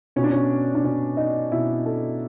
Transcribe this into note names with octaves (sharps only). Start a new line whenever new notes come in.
B2 C#4
D4
C#4
D4
B2 C#4
D#4
B2 E4
A4